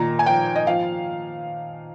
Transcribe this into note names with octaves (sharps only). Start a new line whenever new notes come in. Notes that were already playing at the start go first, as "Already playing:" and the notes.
Already playing: A#2 D#3 A#5
G#5
F3 G5
D#5
F3 F5